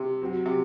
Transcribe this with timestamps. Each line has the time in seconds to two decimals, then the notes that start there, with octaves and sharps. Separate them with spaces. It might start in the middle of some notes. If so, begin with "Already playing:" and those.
Already playing: C3
0.22 F#3 C4 F#4
0.46 C3